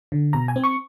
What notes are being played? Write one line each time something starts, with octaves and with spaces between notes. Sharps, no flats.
D3
B2 A#5
G#5
C4
C#6